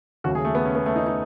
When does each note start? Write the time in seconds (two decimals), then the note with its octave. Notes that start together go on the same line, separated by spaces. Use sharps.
0.24 D#2 C#3 F#3 A3 F#4
0.35 G#4
0.45 A3
0.55 B3
0.65 C#4
0.75 B3
0.86 A3
0.96 D#4
1.06 D#4